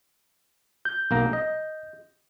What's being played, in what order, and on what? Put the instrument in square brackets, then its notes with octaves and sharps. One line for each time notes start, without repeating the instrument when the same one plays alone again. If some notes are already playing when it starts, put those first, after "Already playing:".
[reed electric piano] G6
[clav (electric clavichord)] B1 A#3 A#5
D#5